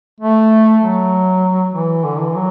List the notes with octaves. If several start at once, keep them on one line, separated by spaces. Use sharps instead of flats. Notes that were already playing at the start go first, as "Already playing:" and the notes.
A3
F#3
E3
D3
E3
F#3